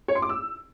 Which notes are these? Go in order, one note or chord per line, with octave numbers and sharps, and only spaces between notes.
C#5
C6
D6
E6